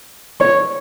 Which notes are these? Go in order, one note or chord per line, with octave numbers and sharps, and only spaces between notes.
C#5